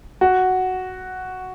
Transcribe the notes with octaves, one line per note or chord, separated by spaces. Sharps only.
F#4